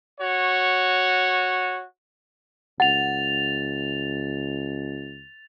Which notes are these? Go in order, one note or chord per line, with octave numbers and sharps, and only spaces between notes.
F#4 C#5
C#2 F#5 A6 F7